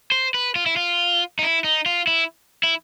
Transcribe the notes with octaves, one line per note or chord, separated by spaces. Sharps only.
C5
B4
F4
E4
F4
D#4
E4
D#4
F4
E4
E4